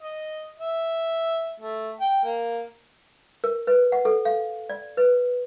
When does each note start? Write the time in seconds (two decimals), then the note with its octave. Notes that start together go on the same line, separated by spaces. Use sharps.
0.02 D#5
0.59 E5
1.60 A3
2.01 G5
2.24 A#3
3.44 A#4
3.67 B4
3.92 F#5
4.05 A4
4.25 F5
4.69 D5
4.97 B4